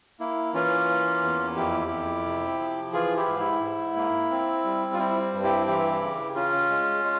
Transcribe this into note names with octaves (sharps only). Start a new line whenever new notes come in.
A#3 E4
E3 C#4 F4
A#3
E2
F2 E4 G4
F2
C3
F3
E3 F4 G#4
E4 G4
G#2
E4
G#2
A#3
C4
G3
F4
C4 E4
G2
E4 G4
E3 E4 G4
C#3
C#4 F4
G#3
G#3